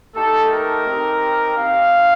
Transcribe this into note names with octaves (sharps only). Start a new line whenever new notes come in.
A3 D#4 G4 A4
A#4
C4 D#4 G4
C4 D#4 G4 F5